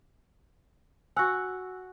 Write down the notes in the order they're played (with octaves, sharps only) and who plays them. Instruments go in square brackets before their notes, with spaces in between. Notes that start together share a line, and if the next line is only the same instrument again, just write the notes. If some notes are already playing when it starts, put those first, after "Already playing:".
[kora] F#4 F#5 [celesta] G#5 E6 F#6